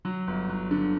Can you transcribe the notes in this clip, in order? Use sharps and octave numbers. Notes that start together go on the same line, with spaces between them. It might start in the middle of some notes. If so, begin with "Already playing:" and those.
F#3
G1
F#3
D3